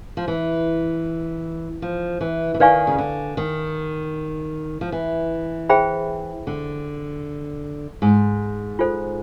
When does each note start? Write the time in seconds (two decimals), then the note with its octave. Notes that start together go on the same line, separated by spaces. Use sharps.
0.17 F3
0.28 E3
1.82 F3
2.21 E3
2.54 E3
2.60 D#3 B4 D5 F5 G#5 C#6
2.87 C#3
2.98 D3
3.37 D#3
4.81 F3
4.92 E3
5.69 G#4 C5 E5 G5 B5
6.47 D3
8.02 G#2
8.79 F4 A4 C5